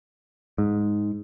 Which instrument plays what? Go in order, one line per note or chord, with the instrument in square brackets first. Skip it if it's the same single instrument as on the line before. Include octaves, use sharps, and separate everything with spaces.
[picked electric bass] G#2